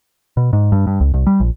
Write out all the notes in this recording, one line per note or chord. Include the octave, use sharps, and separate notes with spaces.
B2
G#2
G2
G2
C#2
C2
G3
A#1